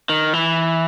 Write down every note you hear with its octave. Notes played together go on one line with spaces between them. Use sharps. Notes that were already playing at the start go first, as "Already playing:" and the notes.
D#3
E3